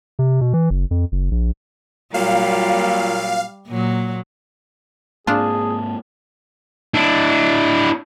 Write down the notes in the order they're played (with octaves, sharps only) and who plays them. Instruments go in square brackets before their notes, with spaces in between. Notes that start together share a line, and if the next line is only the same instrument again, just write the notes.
[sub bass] C3
B2
E3
F#1
F2
F#1
A#1
[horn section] A#2 F#3 [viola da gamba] G3 [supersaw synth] F5
[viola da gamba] A#2 F#3
[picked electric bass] G#2 A#3 C4 [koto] D4 F4 [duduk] G#4 [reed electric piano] A5
[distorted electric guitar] D4 E4